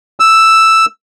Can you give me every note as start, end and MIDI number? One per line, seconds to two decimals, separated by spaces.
0.20 0.85 88